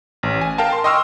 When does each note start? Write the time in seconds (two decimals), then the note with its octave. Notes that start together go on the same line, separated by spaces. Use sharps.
0.23 A1
0.41 G#5
0.58 A#4 F5 G5 A5
0.73 C6
0.84 D#5 G5 C6 C#6 E6 F6